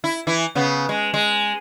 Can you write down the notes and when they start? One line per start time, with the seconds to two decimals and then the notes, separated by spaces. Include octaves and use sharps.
0.04 E4
0.27 E3 E4
0.55 C#3 B3
0.89 G#3
1.14 G#3